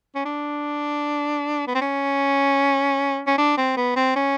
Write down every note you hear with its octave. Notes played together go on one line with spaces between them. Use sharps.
C#4
D4
B3
C4
C#4
C#4
D4
C4
B3
C4
C#4